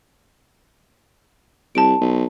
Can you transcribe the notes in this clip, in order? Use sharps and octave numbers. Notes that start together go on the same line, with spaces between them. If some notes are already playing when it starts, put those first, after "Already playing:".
C2 A5 D7
B1